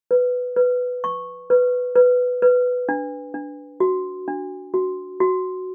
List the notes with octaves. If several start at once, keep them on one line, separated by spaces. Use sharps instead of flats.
B4
B4
C#6
B4
B4
B4
D4
D4
F#4
D4
F#4
F#4